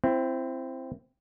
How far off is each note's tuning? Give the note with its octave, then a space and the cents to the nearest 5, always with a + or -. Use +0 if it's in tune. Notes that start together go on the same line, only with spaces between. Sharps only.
C4 +0 E4 +25